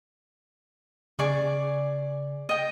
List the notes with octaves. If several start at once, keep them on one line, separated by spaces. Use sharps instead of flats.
C#3 G#4 D5 C#6
D#5 G5